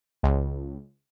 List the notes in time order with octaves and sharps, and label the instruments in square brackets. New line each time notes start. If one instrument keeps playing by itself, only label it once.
[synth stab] C#2